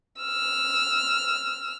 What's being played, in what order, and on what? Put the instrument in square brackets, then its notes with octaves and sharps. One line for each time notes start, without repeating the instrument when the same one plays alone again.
[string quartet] E6 F6